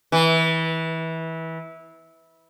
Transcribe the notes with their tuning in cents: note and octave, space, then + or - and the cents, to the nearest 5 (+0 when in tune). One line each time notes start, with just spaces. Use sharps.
E3 -20